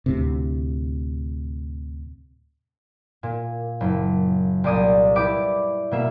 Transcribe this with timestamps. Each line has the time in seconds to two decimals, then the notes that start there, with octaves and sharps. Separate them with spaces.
0.06 D2 A2 C3
3.23 A#2
3.81 F#1
4.64 C2 A#2 D5 D#6 D#7
5.16 E4 G4 B4 D5 D6
5.91 B2 A#3 E5